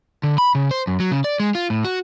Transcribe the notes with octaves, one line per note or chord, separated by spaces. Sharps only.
D3
B5
C#3
C5
F#2
F#3
C#3
D5
G#3
F4
A2
F#4